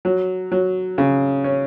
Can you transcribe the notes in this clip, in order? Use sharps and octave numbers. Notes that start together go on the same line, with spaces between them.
F#3
F#3
C#3
C#4